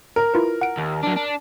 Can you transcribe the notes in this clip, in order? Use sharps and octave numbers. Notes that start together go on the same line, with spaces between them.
A#4
E4 F4 B4
F#5 D7
D#2
F#3 D4
D4